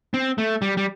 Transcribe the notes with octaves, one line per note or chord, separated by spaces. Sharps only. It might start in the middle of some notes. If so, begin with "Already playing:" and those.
C4
A3
G3
G3